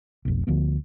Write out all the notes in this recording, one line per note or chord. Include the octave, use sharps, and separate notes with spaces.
F1 B1
D2 F3 B3